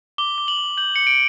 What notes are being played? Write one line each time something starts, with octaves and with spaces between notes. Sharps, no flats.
D6 G7
D6
F#7
D6
G6 F#7
D6 C#7
D7